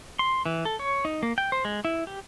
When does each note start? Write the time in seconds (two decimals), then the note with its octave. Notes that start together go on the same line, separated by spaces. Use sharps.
0.19 C6
0.46 E3
0.65 A4
0.79 C#5
1.05 D#4
1.23 A#3
1.38 G5
1.52 C5
1.65 G#3
1.85 E4
2.07 G4